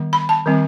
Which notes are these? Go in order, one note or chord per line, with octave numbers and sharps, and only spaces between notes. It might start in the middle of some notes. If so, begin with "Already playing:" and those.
Already playing: D#3 G3 B3
B5
A5
D#3 G3 C4